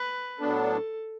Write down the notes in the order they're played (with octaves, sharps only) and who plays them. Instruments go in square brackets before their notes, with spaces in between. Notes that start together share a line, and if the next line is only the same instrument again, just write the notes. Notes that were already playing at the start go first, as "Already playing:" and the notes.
Already playing: [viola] B4
[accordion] A2 F#3 B3 D4 [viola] A4